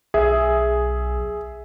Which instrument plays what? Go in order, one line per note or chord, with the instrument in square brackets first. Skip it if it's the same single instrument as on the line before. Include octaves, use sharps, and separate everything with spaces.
[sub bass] B1 [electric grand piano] G#4 [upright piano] E5